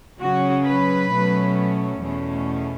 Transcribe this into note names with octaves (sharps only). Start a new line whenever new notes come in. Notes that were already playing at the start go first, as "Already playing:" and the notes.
C#3 F#3 C#4 F#4
B4
B2 F#3 A3 C#4
E2 B2 A3 C#4